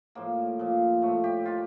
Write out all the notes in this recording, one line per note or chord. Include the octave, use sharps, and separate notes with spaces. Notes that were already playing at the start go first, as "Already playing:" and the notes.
A2 F3 A#3
A#2 F3
A2 F3 A3
G4
D#3 F4